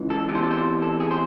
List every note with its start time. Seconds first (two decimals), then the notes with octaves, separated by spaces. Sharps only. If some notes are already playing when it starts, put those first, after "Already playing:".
Already playing: C#2 E3
0.10 A4
0.28 E2 C3 E3
0.35 C5
0.43 A4
0.51 C5
0.82 A4
1.00 G#4
1.11 C5